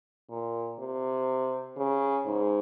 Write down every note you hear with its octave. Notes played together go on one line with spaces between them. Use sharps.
A#2
C3
C#3
G#2